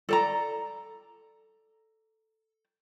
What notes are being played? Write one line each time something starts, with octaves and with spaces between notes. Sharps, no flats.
A4 D5 A#5